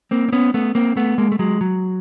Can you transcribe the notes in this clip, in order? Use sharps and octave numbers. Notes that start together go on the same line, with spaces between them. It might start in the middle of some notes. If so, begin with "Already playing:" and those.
A#3 C4
C4
B3 C#4
A3 B3
A#3 C4
A3 B3
G#3 A#3
A3
F#3 G#3
F#3